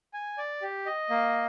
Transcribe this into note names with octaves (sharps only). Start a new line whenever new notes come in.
G#5
D5
G4
D#5
A#3